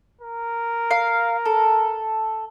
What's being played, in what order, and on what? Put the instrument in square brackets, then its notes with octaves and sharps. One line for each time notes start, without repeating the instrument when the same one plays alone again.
[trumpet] A#4
[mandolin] F5
A4